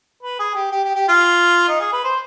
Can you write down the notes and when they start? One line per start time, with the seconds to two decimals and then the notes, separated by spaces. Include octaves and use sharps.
0.23 B4
0.39 G#4
0.55 G4
0.72 G4
0.84 G4
0.96 G4
1.08 F4
1.69 D#4
1.80 G#4
1.92 B4
2.04 C5